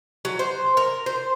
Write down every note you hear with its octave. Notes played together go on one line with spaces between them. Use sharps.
F#3
C5
A#4
C5